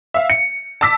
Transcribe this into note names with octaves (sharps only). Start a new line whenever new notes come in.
E5 F5
C#7
A5 D6 E6 B6